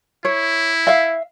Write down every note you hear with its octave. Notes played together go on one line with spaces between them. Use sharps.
E4 C#5
E5 F5